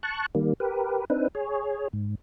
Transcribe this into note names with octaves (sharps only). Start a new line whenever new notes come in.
A5 C#6 F#6
D#3 G3 A#3
G4 A#4 B4
C4 D4 D#4 B4
G#4 C#5
G#2